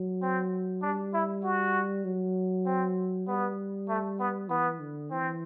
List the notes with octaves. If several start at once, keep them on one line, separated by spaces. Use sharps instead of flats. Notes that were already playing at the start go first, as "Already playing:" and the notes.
Already playing: F#3
C4
G3 D4
E4
F#4
F#3
C4
G3 B3
A3
B3
E3 B3
D3
E3 C4